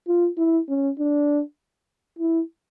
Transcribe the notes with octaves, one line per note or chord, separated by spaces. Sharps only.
F4
E4
C#4
D4
E4